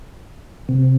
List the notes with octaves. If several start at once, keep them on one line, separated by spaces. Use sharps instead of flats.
C3